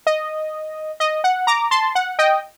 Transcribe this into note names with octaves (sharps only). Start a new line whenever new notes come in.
D#5
D#5
F#5
A#5 D6
A5 C6
F#5
D#5 G5